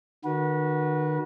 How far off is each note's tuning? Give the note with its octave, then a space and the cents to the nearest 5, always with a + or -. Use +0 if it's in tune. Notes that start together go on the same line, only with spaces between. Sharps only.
D#3 -40 F#4 +0 B4 -30